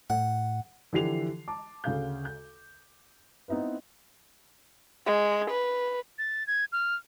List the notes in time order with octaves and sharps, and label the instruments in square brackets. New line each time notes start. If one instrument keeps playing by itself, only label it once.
[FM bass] A2 [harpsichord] F#5
[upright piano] D3 E3 F3 G4 C7 F7
A5 D6
D2 C#3 F5 G6
G6
B3 C4 D#4 E4 B4
[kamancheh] G#3
B4
[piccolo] A6
G#6
F6